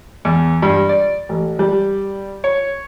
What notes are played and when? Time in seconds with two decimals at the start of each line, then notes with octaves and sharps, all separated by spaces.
0.25 E2
0.62 G2
0.89 D5
1.29 A1
1.59 G3
2.44 C#5